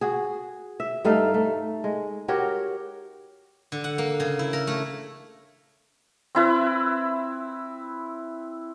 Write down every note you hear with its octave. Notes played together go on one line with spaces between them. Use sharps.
F#4 G#4
E5
G2 A3 D#4 F5
A3
G#3
F#4 G4 A#4 C#5
D3
F#5
A#3
C#3
E4
A#4
A3
C4 E4 B4